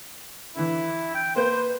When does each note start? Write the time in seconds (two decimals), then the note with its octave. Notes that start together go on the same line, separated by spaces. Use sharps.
0.55 D3 E3 E4
1.14 G5
1.35 A#3 B4 C5 G6